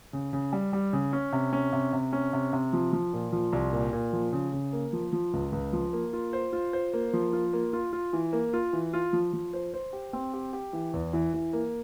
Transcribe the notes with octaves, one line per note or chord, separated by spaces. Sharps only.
C#3
C#3
G3
G3
C#3
C#4
C3
C#4
C3
C3
C#4
C3
C3
F3
F3
A#2
F3
C2
A#2
A#2
F3
C#3
C#3
A#3
F3
F3
C#2
C#2
F3
A#3
F4
C5
F4
C5
A#3
F3
F4
A#3
F4
F4
E3
A#3
F4
E3
F4
F3
F3
C5
C5
G4
C4
G4
G4
E3
E2
E3
E3
A#3